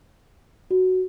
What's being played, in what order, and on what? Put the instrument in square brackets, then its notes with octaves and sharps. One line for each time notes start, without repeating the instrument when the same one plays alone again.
[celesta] F#4